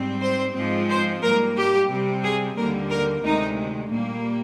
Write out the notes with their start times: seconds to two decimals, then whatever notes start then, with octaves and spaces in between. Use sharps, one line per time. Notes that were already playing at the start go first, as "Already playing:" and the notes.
Already playing: G#2 G3 C4
0.21 C5
0.55 G#2 F3 G#3 C4
0.89 C5
1.22 G#2 G3 A#3 A#4
1.56 G4
1.89 C3 G3 C4
2.23 G#4
2.56 D#2 D3 G3 A#3 A#4
2.90 A#4
3.24 D2 C3 D#3 G#3 D#4
3.89 A#2 G3 A#3